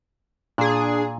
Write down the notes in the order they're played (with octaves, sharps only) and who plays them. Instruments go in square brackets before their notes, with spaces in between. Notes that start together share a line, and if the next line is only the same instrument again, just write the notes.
[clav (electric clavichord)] A#2 [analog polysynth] D4 G#4